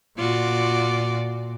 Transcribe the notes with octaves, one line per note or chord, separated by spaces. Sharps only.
A#2 F4 F#4 D5